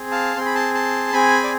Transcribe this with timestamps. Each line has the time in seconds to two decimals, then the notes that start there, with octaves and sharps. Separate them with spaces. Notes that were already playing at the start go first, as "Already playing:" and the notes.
Already playing: C4 G#4
0.11 F5 A5
0.37 C4 G#4 C6
0.46 B5
0.55 A5 C6
0.74 A5 C6
1.13 C4 G#4 G#5 B5
1.44 D5